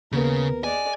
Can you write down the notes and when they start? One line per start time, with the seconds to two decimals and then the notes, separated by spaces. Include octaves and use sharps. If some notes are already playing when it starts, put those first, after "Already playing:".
0.12 D#2 C#3 B3 A#4
0.64 G#3 D5 G#5